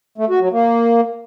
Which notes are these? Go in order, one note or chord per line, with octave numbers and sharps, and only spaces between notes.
A3
F#4
F#3
A#3